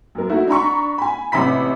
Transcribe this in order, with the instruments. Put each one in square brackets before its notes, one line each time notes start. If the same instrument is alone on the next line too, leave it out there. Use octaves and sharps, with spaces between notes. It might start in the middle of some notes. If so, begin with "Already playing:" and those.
[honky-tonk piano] F#2 A#4
A3 D#4 E4 F#4
D4 A#5 B5 C#6
G#5 B5
A1 C3 B5 B6